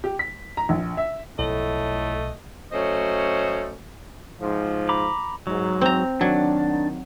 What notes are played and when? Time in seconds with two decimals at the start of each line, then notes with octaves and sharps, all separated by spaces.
0.04 G4
0.19 B6
0.57 A#5
0.69 A#1
0.97 E5
1.39 B1 A2 F3 A3 D#5
2.72 F#3 A3 C#4 C5 D#5
4.41 G#2 F3
4.89 A#5 B5 D6
5.47 G#2 F#3
5.81 C4 A#5
6.21 D#3 F#3 D4 D5